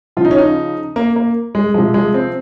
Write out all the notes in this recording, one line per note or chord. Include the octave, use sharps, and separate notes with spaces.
C#3 F3 F4
D#4
C#4
D#4
A#3
A#3
G#3
C3 F3 G#3
G#3
C4